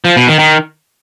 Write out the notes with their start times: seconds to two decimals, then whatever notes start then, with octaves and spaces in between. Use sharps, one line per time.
0.05 F3
0.16 B2
0.27 D#3
0.39 D#3